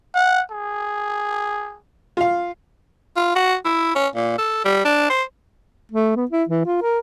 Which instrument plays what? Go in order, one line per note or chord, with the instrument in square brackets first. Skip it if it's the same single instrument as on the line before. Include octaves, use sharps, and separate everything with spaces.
[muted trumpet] F#5
G#4
[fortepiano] F4 F5
[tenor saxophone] F4
F#4
E4
C#4
A#2
A4
G3
D4
C5
[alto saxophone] A3
B3
E4
E3
F4
A#4